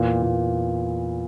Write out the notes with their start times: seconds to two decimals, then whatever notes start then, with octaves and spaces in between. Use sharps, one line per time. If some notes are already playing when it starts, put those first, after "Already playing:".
Already playing: E2 A#2
0.22 A#2